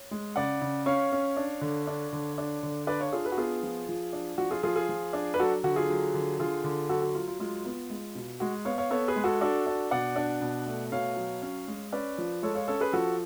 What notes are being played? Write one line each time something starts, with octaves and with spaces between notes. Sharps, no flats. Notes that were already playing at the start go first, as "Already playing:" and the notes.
Already playing: C#5
G#3
C#3 D5 F#5
C#3
C#4 C#5 F5
C#4
D4
D3
D4
D3
D4
D3
D4 B4 D5
C#5 F5
D4 F4 G#4
G#4 B4
F#4
B3 F4 G#4
F3
F3
D4
F3 F#4
F4 G#4
F3 F4 G#4
F4 G#4
F3
D4
B4
F#3 F#4 A4
D3 F#4
F4 G#4
F#3
D3
D3 F4 G#4
D3
F#3 F#4 A4
F#4
F#3 F4
F4
G#3 F4
B3
G#3
B2
G#3 F#4
B3 C#5 F5
C#5 F5
B3 A4 C#5
G#4 B4
G#3
F#4 A4
D4 F#4 A4
D4
B2 D5 F#5
D4
B2
A3
B2 C#5 F5
F#3
C#4
G#3
C#4 B4 D5
F3
G#3 A4 C#5
C#5 F5
C#4 A4 C#5
G#4 B4
F3 F#4 A4